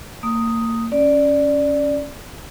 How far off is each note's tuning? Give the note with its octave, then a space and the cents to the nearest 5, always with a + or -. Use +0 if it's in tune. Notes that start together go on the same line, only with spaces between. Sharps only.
A#3 -30 D#6 +0
C#4 +0 D5 +0